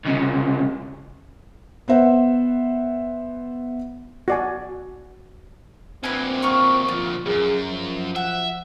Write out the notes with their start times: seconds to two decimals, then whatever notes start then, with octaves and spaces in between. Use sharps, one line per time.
0.05 C2 C#3
1.88 B3 C5 E5 F#5
4.28 F#4 D5 G#5
6.03 D2 A#2 C4 B4 G#5
6.42 F4 A#5 C#6
6.88 F3 F4
7.26 C#2 F#2 G#4
7.70 F3
8.16 E5 F#5